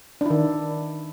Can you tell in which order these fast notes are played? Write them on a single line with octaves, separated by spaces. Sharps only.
D4 E4 D#3